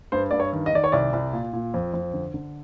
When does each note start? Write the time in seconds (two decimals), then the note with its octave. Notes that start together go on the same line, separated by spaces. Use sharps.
0.12 G2 C5
0.31 G2 D5
0.40 C#5
0.53 D#3
0.66 D#5
0.73 D#3 D5
0.84 C#5
0.92 C2 D5
1.13 C2
1.33 A#2
1.53 A#2
1.74 F2
1.94 F2
2.14 D3
2.34 D3